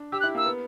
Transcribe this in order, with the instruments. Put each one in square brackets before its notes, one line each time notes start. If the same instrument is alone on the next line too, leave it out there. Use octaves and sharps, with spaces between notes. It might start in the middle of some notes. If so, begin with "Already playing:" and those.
Already playing: [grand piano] D4
[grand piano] G4 [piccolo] E6
[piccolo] F#6
[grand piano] E4
[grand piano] A#3 [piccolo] E6
[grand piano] B3